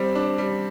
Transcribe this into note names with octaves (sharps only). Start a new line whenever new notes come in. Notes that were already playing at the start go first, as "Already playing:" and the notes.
Already playing: G3 C4
D4
G3